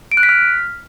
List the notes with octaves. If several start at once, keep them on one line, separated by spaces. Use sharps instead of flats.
D7
F#6
B6
F6